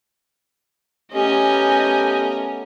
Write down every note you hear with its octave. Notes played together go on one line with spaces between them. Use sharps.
A3 B3 C#4 G4 A#4 D#5 G#5